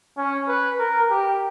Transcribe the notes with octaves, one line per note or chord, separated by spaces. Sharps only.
C#4
B4
A#4
G4